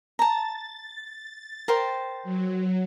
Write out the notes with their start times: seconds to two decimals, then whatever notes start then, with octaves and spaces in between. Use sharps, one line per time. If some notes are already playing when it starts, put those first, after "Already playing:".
0.19 A5 A#5 A6
1.68 A#4 C5 G5
2.23 F#3